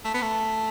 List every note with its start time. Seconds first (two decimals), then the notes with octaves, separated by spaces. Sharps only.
0.05 A3
0.14 B3
0.22 A3